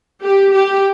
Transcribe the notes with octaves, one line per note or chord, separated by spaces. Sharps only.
G4
G4